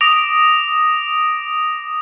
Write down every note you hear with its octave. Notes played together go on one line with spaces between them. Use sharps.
D6 D#6 A#6 D7 F7